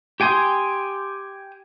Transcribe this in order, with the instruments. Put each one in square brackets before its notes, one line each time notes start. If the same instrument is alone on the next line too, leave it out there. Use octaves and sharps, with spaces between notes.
[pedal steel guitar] G4 G5 G#5 C6 D#6